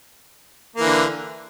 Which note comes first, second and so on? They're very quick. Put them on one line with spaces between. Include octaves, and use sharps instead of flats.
A#3 E3 D3